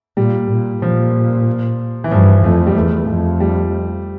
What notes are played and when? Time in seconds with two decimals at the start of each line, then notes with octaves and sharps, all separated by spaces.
0.17 A#2 G3
0.50 A#2
0.82 A#2 F3
2.04 E3
2.11 G2 F3
2.44 F2 A3
2.67 G3
2.76 E2 A3
3.08 F2
3.40 G3